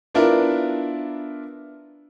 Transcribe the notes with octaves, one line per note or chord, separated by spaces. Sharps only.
B3 D4 E4 F4 A#4